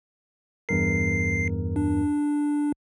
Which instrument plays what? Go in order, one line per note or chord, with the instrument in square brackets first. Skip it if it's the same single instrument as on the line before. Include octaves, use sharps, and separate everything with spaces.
[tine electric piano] E2 G2 A#4 [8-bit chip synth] C7
[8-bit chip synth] D4